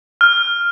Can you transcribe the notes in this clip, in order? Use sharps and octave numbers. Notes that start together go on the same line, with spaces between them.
F6